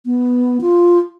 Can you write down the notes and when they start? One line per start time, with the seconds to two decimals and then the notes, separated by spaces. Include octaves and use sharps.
0.06 B3
0.61 F4